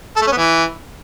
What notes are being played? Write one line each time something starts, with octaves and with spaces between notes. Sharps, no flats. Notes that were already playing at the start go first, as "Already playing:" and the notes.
A4
A3
C#4
B3
E3